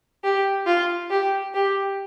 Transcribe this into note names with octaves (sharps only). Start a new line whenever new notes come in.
G4
F4
G4
G4